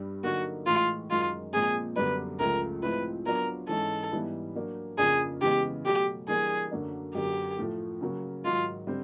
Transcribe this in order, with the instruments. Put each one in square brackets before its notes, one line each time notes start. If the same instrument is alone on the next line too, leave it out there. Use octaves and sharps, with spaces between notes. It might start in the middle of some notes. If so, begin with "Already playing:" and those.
Already playing: [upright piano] G2 G3
[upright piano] D3 F#3 A#3 D#4 [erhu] F#4
[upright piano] A2 E3 G#3 [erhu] F4
[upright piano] F#2 D#3 G#3 [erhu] F4
[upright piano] A#2 F3 G#3 C4 [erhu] G#4
[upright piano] F#2 D3 G3 B3 D4 [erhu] B4
[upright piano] C#2 C#3 F3 A3 [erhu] A#4
[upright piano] A2 F3 G#3 C4 E4 [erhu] B4
[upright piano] F#3 B3 D4 F4 [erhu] A#4
[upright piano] G#2 E3 G#3 C#4 E4 [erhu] A4
[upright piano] G#2 E3 G3 B3 E4
F#3 A#3 D4
[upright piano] F2 C#3 F3 A#3 D4 [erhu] G#4
[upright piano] C#3 E3 G#3 B3 [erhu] G4
[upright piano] B2 F#3 A3 [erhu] G4
[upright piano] E3 G3 A#3 D4 [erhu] G#4
[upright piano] F#2 D3 F#3 A#3 D4
[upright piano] F#2 D3 F#3 A#3 D4 [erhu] G4
[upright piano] A2 F3 A3
C#3 F#3 A#3
[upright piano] G#2 D#3 F#3 [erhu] F4
[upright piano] D3 G3 C4